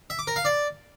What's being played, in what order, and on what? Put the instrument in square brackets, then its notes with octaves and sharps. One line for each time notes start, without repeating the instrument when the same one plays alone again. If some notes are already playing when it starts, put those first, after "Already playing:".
[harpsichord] E5
D6
A#4
F5
D5